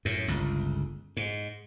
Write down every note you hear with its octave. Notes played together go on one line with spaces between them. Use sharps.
F#2 A2
G1 C#2
G#2